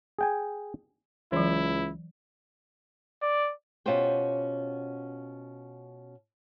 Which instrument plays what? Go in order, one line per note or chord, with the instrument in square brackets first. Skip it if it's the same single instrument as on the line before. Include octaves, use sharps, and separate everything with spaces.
[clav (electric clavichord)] G#4 G5 G#5
[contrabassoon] C#2 [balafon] E3 F#3 [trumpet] E4
[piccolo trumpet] D5
[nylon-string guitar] B2 C#4 F4 G4 C5 G5